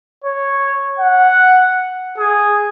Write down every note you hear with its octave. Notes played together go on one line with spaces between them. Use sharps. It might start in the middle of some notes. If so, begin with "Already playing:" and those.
C#5
F#5
G#4